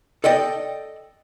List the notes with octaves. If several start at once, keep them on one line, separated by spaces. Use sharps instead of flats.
A4 D5 D#5 G5